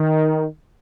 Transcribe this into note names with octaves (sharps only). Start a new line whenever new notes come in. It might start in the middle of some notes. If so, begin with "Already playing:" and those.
Already playing: D#3